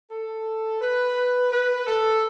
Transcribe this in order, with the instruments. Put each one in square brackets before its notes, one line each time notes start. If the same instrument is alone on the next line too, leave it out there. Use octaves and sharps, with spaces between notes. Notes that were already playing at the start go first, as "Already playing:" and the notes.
[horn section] A4
B4
B4
A4